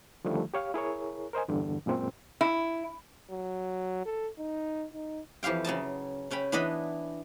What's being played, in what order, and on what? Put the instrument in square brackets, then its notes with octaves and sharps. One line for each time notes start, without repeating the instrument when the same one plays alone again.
[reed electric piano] D3 D#3 F3 G3 A3
G4 C#5 F5
E4 G#4 A#4 C#5
A#4 C5 D#5 G#5
E2 G2 D3
F#2 A#2 G#3 C4
[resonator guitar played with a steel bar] E4
[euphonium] F#3
A4
D#4
D#4
[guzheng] F2 E3 G4 F5 G5
C#3 F#3 D#5 A5
C#3 C#4 G5 B5
E3 B3 D4 B4 D#5 B5